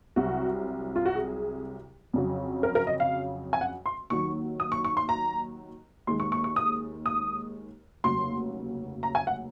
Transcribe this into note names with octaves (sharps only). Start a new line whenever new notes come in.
C2 C3 F#3 F#4
F4
F#4
G#4
F2 C#3 F#3
A#4
A#4
D#5
F5
G#5
F#5
C6
D#2 D#3 F#3 C#6
D#6
C#6
C#6
C6
A#5
D#2 D#3 G#3 C6
C#6
C#6
C#6
D#6
D#6
F1 D#2 C#3 F#3 C6
A#5
G#5
F#5